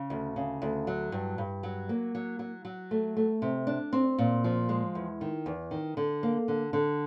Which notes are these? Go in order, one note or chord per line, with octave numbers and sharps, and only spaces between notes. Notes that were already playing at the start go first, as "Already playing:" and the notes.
Already playing: C#3
D2
C#3
D2
F#3
G2
G2
F#3
A#3
F#3
F#3
F#3
A3
A3
C3
D4
C4
A#2
F3
G#3
E2
D#3
E2
D#3
D3
A#3
D3
D3